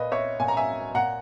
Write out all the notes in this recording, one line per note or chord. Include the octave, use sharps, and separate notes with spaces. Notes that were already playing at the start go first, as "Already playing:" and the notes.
Already playing: A#2 B4 D#5
C#5 E5
A#2 G#5
A#5
E5 G#5
A#2 F#5 A#5